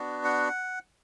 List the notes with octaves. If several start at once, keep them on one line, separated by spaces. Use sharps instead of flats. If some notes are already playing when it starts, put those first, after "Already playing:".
Already playing: B3 D4 F#4
F#5